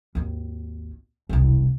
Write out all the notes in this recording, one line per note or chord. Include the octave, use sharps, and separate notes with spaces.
G#1 D#2
E1 C2